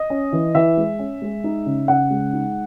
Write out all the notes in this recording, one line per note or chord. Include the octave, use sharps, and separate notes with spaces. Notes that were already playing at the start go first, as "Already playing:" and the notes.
Already playing: D#5
C#4
E3
E3 E5
G#3
C#4
G#3
D#4
C#3
C#3 F#5
G#3
D#4